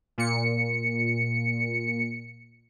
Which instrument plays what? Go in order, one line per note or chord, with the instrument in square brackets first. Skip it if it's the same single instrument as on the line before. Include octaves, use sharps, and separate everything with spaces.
[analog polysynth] A#2 C#7